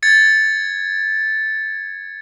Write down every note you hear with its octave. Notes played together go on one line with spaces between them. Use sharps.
G#6 A6 C#7